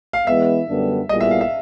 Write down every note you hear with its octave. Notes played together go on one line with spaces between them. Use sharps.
F5
E3 G#3 B3 E5
F#2 D3 G3 B3 D4
A#2 G3 B3 E4 G#4 D#5
E5
F5
E5